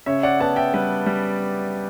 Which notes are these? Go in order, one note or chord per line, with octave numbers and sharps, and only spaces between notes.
C#3 C#5 E5
D5 F#5
B3 F#5 A5
E5 G5
G3 B4
G3